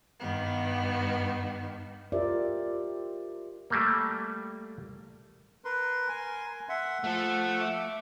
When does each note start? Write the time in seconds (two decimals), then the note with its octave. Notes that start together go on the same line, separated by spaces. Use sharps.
0.19 G2 D#3 B3
2.12 F4 G4 A#4 C5 D5 E5
3.70 G3 A3 A#3
5.65 A#4 B4 C6
6.09 G#5
6.69 E5 F#5 C6
7.04 F3 A3 A4 F#5
7.60 E5 D6